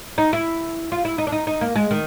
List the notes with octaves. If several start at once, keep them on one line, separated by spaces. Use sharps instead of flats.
D#4
E4
F4
E4
D#4
D4
D#4
D#4
A#3
G#3
D#3